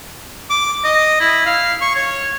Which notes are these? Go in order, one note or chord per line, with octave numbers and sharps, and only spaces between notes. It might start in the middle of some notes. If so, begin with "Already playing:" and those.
D6
D#5
E4
F5
C#6
C#5